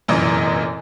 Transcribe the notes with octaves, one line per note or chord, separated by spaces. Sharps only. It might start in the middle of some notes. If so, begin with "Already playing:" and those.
F1 F#2 A#2 E3 D#5